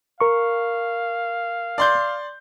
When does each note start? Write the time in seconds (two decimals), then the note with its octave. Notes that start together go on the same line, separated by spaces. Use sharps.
0.21 A#4 F5 C#6
1.78 D5 C6 G6